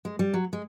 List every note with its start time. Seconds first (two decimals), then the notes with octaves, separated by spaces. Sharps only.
0.05 G#3
0.19 G3
0.34 F#3
0.53 G#3